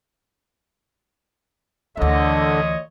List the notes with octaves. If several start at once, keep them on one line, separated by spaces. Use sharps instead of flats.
D2 A#2 D3 E3 C#5 D#5